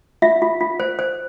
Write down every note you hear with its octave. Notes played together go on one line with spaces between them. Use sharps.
F4 E5
F4
F4
C5
C5